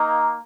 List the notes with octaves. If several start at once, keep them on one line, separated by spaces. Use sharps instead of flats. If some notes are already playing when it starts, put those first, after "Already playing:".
Already playing: A#3 D#4